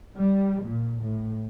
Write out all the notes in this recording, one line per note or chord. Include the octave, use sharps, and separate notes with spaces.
G3
A#2
A2